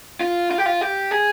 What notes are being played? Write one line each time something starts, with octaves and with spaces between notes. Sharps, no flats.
F4
F4
G4
F4
G4
G#4